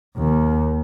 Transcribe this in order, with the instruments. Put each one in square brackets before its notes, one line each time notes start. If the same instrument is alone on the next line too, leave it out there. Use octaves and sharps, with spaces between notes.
[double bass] D#2